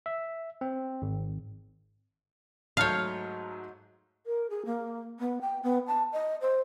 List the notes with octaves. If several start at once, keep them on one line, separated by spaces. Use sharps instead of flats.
E5
C4
G#1
G#2 F#3 A3 C#5 F5 A5 F6 G6
A#4
G#4
A#3
B3
G5
B3
A5
D#5
C5